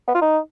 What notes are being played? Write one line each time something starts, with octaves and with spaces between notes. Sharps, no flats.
B3
F4
D#4